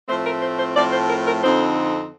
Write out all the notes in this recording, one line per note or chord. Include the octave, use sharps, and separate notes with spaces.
A2 F3 A3 C4 C5
A#4
C5
C5
A2 F3 A3 C4 D5
C5
A#4
A#4
F2 D3 F3 C4 D#4 C5